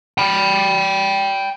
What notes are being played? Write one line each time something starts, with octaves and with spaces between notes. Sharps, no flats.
G5 B5